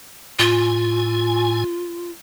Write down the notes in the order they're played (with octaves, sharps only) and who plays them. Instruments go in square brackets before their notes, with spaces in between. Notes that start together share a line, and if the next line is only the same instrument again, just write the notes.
[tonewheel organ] A2 G#5 [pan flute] F4